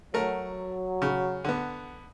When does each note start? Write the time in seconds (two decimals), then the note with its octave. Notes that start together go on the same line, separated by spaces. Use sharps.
0.14 F#3 A3 A#4
1.02 C#3
1.44 D3 B3